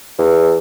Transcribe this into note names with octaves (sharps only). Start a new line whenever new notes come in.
E2